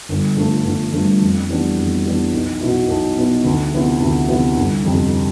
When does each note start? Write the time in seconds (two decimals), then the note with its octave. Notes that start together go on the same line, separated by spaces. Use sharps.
0.09 G1
0.36 G2 F3 A3
0.65 G1
0.92 G2 F3 A3
1.21 F2
1.49 E3 G3 B3 D4
1.77 F2
2.05 E3 G3 B3 D4
2.33 B1
2.61 B2 B3 E4
2.88 B1
3.16 B2 B3 E4
3.44 D2
3.72 C3 F3 B3 E4
4.00 D2
4.28 C3 F3 B3 E4
4.56 G1
4.85 F2 C3